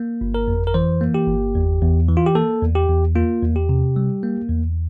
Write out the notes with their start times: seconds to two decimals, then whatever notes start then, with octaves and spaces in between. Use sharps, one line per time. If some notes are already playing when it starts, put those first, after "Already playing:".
Already playing: A#3
0.21 G1
0.34 A#4
0.48 F2
0.67 A#4
0.74 E3 C5
1.01 A#3
1.14 G4
1.28 G1
1.55 E2
1.82 E2
2.08 E3
2.17 F4
2.26 G4
2.35 A#3 A4
2.62 E2
2.75 G4
2.89 E2
3.15 A#3 F4
3.43 E2
3.56 G4
3.69 C3
3.96 G3
4.23 A#3
4.49 E2